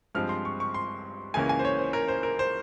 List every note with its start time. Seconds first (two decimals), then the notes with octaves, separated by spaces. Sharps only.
0.15 G2 F3 G#3 C4 F6
0.29 C6
0.45 C#6
0.60 C#6
0.74 C6
1.34 C#2 C#3 E3 A#3 C#4 G#5
1.49 G#5
1.59 C5
1.65 C#5
1.79 C5
1.93 A#4
2.08 C5
2.23 A#4
2.39 C5